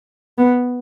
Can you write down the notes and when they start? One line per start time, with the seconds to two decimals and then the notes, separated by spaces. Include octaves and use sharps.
0.38 B3